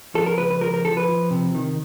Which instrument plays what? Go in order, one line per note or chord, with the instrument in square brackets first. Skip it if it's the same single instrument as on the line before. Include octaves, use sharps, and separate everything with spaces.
[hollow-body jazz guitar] F3 A4
A#4
C#2 B4
B4
F3 A#4
A#4
F3 A4
B4
F3
C3
D#3